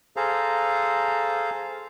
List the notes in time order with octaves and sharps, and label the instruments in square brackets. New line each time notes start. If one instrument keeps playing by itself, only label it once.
[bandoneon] G#4 A4 C5 F5 A#5